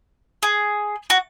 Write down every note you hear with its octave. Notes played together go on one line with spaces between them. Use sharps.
G#4
F#4